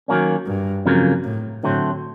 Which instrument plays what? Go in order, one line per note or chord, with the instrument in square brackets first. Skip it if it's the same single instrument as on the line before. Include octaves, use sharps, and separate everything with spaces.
[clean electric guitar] D#3 F#3 A#3 C#4
[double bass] G2
[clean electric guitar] F2 C#3 F#3 A#3
[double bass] A2
[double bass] A2 [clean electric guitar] D3 F#3 A3 C4